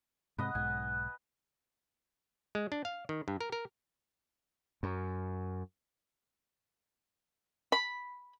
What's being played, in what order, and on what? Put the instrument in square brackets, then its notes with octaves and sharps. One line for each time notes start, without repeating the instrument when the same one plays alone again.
[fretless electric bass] G#2 C3 [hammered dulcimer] B4 D#5 F#5
[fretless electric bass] B1 G#2 [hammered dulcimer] G#5
[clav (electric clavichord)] G#3
D4
F5
D#3
G2
A#4
A#4
[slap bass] F#2
[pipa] B5